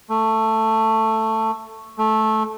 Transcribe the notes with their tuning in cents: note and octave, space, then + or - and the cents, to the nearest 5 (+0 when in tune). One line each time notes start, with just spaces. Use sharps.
A3 +10
A3 -10